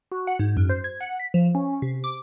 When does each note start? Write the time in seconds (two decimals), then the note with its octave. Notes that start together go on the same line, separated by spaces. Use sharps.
0.12 F#4
0.27 F#5
0.39 G#2
0.57 F#2
0.69 C5
0.84 G#6
1.01 F#5
1.20 B6
1.34 F3
1.55 C#4
1.82 C3
2.04 D6